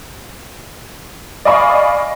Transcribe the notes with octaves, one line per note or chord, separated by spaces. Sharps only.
D5 D#5 F5 G#5 B5 C#6